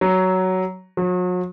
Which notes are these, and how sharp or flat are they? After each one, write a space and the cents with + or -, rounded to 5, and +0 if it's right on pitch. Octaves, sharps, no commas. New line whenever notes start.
F#3 +10
F#3 -40